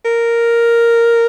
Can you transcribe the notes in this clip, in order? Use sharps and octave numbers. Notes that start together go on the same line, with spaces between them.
A#4